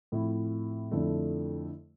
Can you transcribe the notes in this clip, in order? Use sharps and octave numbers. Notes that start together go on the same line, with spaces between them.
A2 F3 C4 E4
F2 D3 A3 E4